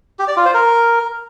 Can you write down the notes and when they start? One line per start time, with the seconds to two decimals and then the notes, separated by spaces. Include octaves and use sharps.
0.19 G4
0.28 D5
0.37 F4
0.45 C5
0.54 A#4